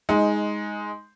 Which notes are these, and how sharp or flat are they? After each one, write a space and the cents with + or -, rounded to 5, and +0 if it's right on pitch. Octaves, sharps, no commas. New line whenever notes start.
G#3 +0 D#4 +15